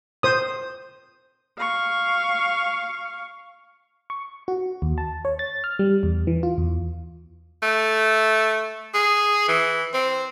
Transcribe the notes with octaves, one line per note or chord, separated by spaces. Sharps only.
C5 D#6
F5 C#6
C#6
F#4
D#2
A5
C#5
A6
F6
G3
E2
E3
F4
E2
A3
G#4
E3
C4